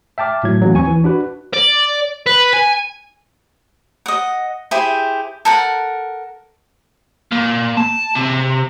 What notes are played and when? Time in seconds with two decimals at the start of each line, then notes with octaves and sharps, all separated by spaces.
0.18 E5 G5 A5 D6 F6
0.44 A2 F#3 G#6
0.61 E3 F#3 A3 A#3 C#4
0.73 D#2 C4 G#5 C#6
0.87 E3
1.04 D4 F#4 B4
1.54 D5
2.27 B4
2.53 G#5
4.06 D#5 F#5
4.71 E4 G4 G#4 C5
5.45 A4 A#4 F#5
7.32 A#2
7.77 A5
8.15 C3